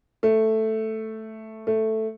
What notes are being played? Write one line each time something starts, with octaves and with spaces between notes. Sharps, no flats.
A3
A3